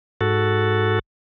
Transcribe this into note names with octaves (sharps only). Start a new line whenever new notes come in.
G#2 F#4 A4